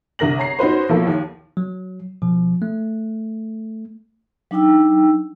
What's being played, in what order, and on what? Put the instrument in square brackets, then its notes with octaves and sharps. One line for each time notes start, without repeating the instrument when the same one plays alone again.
[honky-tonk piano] C2 D3 A#4 A#6 F#7
C#5 A#5 C7
C#4 D#4 F#4 B4 C5
B1 F3 A#3 E4 A4
D#2
[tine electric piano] F#3
B2 F3
A3
[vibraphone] F#3 D4 D#4 G5 E6